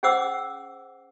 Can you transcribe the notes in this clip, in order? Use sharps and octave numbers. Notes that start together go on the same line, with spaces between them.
C#4 G#4 C5 F#5 D6 E6